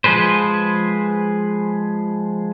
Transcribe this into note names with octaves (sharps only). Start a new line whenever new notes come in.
F3 G#3 G#4 B4 C5